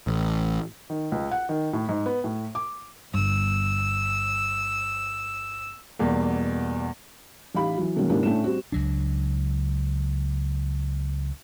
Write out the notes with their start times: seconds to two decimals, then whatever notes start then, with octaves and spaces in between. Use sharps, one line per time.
0.07 A1
0.90 D#3
1.12 C#2
1.32 F#5
1.49 D#3
1.73 A2
1.89 G#2
2.06 B3
2.24 A2
2.55 D6
3.14 G1 G2 E6
5.99 E2 B2 G3 A#3
7.55 A1 D#4 G4 F5 B5
7.77 E3 F#3
7.96 B2 D#3 F#3 G#3 A#3 C#4
8.09 G#2 C#3 G3 A#3 D4 E4
8.23 A2 A3 C#4 D4 E7
8.44 G3 C4 F#4
8.72 C#2 F#3 D4